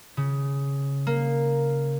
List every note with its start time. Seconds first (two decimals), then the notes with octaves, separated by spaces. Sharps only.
0.17 C#3
1.07 A#3